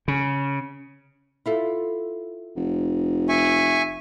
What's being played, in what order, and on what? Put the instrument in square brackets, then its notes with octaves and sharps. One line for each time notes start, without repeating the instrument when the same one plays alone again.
[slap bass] C#3
[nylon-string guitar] E4 F4 A4
[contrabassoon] F1
[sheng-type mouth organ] E5 G#5 C#6